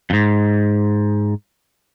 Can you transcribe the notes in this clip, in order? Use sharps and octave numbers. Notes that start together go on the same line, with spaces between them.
F2 G#2